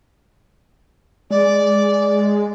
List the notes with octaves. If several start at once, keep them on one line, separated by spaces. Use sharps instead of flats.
G#3 D5